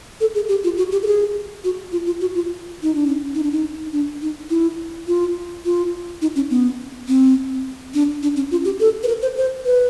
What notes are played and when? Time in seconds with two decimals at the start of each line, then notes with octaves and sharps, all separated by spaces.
0.20 A4
0.35 G#4
0.49 G4
0.64 F4
0.77 F#4
0.92 G4
1.02 A4
1.06 G#4
1.64 F#4
1.92 F4
2.06 F4
2.21 F#4
2.35 F4
2.83 D#4
2.95 D4
3.07 C#4
3.35 D#4
3.44 D4
3.52 D#4
3.92 D4
4.22 D#4
4.50 E4
5.07 F4
5.65 F4
6.21 D#4
6.36 C#4
6.50 B3
7.08 C4
7.94 D4
8.23 D4
8.36 C#4
8.51 F4
8.65 G4
8.80 A4
9.03 B4
9.08 A#4
9.22 C5
9.37 C5
9.65 B4